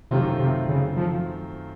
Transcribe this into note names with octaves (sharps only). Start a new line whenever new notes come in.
F#2 C3 D#3 A3 C4 F4
C3
C#3
F3